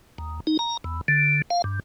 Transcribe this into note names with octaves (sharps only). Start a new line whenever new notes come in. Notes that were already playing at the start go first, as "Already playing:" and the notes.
D#2
D#4
A#5
E2
D3
F5
G2